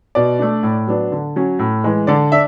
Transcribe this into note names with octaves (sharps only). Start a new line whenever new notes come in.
B2 D5
A3 D4
A2
F#3 B3 D4
D3
F#3 C#4
A2
E3 G#3
D3 D5
D4 E5